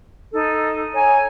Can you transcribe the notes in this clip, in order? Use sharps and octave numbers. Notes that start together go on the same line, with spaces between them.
D#4 A4
C#5 G#5 A#5